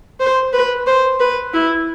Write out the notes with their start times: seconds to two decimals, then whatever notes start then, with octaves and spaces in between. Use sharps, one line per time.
0.20 C5
0.53 B4
0.87 C5
1.20 B4
1.53 E4